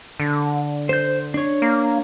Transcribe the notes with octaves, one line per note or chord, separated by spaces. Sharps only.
D3
C5 G6
D4 C#5
A#3